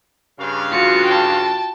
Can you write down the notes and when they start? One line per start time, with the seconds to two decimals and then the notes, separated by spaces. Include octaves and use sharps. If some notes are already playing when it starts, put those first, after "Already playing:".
0.39 G2 C#3 F5
0.72 F4 F#4 C#7
1.06 G5 A5